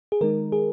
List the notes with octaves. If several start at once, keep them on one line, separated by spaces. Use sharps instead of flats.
G#4
D#3 G#3 D#4 A#4
G#4